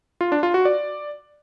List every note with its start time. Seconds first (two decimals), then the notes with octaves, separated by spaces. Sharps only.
0.21 F4
0.32 D4
0.43 F4
0.54 F#4
0.65 D5